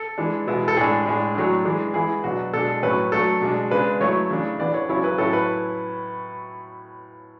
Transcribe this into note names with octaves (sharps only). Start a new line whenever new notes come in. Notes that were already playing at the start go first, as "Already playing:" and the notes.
Already playing: A4
E3 G#3 D4
B2 G#3 B3 E4
A4
A2 G#3 D4 G#4
A2 G#3 D4
A2 F#3 A3 D4
E3 G#3 D4
E3 G#3 B3 E4 G#4
B2 F#3 B3 D4 F#4
B2 G#3 D4 A4
A2 F#3 A3 C#4 E4 B4
F#3 A3 D4 A4
B2 G#3 D4
C#3 G#3 D4 B4
F#3 A3 E4 C#5
C#3 E3 A3 D4
E3 B3 D4 D5
C#5
C#3 F#3 C#4 E4 C#5
B4
A2 F#3 C#4 E4 A4
B4